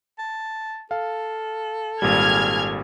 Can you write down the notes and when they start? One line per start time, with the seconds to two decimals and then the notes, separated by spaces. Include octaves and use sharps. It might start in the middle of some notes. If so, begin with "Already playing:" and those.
0.18 A5
0.91 A4 F5
2.02 G#1 A#2 G3 G#4 F6 G#6